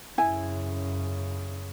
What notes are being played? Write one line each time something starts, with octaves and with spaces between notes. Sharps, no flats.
F#2 C#3 E4 G#5